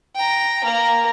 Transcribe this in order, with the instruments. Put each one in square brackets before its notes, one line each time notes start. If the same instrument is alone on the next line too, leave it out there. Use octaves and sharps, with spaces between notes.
[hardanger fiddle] G5 A#5
A#3 A#4